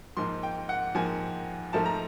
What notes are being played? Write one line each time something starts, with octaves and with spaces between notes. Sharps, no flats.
G#2 F3 A#3 C6
G5
F#5
G#2 F3 A#3 G#5
G#2 F3 A3 A5
A#5